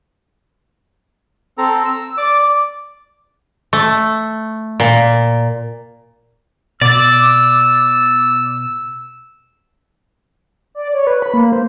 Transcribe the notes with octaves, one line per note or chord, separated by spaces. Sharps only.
C4 A4 A#5
E6
D5 D6
A3
A#2
B2 D5 D6 E6 A6
D5
C#5
B4
B5
A#3
C5